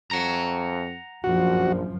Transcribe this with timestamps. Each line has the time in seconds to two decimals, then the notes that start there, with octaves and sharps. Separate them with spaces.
0.11 F2 F#5 A#5
1.24 A#1 F#2 F3 F#4